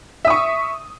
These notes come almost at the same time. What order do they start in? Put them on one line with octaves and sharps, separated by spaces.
E5 D#6 C#6